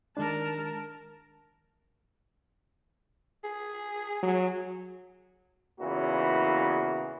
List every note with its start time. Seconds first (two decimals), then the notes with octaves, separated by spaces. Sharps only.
0.17 D#3 G#3 D4 A#4 A5
3.44 G#4
4.23 F#3
5.80 E2 A#2 C#3 E3 A#3 F#4